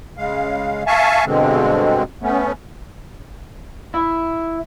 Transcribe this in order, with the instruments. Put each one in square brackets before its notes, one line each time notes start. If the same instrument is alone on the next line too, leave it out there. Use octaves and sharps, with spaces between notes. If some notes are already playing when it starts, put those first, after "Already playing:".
[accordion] C#3 G#3 F5
E5 F5 G#5 A5 C#6
G2 B2 D3 G#3 C4
A3 B3 C#4
[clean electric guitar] E4 E5